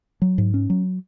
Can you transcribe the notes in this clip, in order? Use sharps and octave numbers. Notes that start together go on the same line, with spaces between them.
F#3
G#2
C#4
F#3